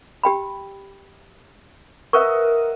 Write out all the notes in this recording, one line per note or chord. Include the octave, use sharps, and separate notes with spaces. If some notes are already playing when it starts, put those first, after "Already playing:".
G4 G5 B5
A#4 B4 D#5 E5 F#5 C#6